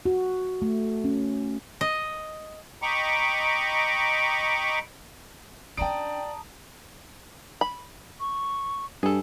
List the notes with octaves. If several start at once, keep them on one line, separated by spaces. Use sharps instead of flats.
F#4
A3
C#4
D#5
D#5 G5 A#5 B5 C#6 D6
C#4 D4 D5 G5 A5 A#5 D#6 D7
B5
C#6
G2 G#4 A4